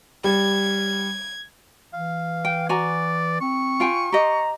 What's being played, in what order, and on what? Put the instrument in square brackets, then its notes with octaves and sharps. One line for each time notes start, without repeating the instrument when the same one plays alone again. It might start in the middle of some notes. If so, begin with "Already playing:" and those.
[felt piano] G3 [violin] G#6
[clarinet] E3 [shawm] F5
[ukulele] G5
[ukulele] F#4 G#5 A#5 [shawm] D5
[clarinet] C4 [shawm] C#6
[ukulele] F4 G5 G#5
[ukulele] G4 D#5 [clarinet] A#5